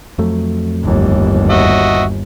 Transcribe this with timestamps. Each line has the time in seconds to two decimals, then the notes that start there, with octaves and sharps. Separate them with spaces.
0.19 F2 F#3 A3
0.84 G1 D#2
1.50 F#4 D#5 E5